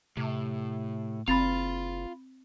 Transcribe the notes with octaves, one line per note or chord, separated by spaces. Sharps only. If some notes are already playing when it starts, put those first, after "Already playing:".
A2 C3
F#1 C4 F4 B5 A6 F7